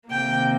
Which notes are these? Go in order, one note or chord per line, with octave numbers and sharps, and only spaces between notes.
C3 D#3 A#3 G5